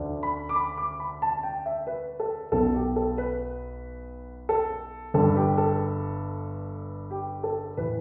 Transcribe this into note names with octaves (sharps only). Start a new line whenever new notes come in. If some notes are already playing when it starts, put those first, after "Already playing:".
Already playing: D2 D3
B5
D6
B5
D6
B5
A5
G5
E5
B4
A4
B1 B2 A4
G4
A4
B4
A4
G1 G2 D3 A4
G4
A4
G4
A4
A2 E3 B4